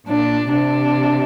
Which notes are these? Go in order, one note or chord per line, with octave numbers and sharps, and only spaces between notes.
A#2 D4
C3 D4